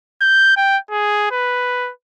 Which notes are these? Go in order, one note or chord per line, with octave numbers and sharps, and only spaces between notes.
G6
G5
G#4
B4